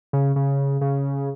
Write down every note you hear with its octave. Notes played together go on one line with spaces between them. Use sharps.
C#3
C#3
C#3